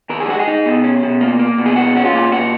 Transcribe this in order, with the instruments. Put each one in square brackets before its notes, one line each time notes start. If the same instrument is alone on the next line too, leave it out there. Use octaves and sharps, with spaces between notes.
[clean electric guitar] D#2 A#4
G#4
G#3 F#4
G#4
D#4
B2
C#4
B2
A#3
A#3
B2
G#4
G#3 F#4
C#4 F#4
F4
A#2
A#2 F#4